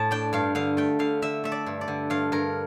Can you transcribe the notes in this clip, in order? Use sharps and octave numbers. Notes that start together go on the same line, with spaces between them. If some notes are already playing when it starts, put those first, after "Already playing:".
Already playing: A2 A3 A5
D4 G5
G2 F5
D3 F5
A3 G5
D3 F5
D3 E5
A3 E5
D5
G2
D5
D3
G2 F5
G2 A#4